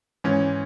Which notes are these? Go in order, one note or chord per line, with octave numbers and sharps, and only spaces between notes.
G#2 E3 C#4